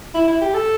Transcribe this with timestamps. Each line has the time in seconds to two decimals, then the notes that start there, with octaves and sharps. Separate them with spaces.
0.14 E4
0.27 E4
0.41 G4
0.54 A4